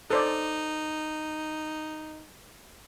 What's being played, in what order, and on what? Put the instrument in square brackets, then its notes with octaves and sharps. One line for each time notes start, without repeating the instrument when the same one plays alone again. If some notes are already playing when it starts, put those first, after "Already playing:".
[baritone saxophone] D#4 [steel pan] A4 C5 D5